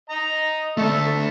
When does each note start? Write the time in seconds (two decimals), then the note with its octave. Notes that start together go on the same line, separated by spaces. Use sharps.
0.10 D#5 A#5
0.77 A3 A4 D5 E5